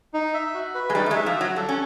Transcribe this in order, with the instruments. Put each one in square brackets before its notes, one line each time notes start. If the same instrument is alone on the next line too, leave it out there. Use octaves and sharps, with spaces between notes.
[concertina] D#4
E5
F#4
B4
[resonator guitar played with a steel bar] G#3
[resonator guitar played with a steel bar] G3 [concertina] D#4
[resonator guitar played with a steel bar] A3
G#3
[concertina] E5
[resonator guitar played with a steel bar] F3
[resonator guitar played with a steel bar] F#3 [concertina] F#4
[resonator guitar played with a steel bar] G3 [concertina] A4
[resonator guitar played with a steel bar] C#4